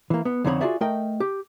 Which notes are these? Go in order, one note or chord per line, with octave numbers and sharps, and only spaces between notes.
E3 A#3
B3
F2 D3 C4 D#4 C#5 B5
F4 F#4 G#4 D5 E5
A3 A#4 D#5 G5
G4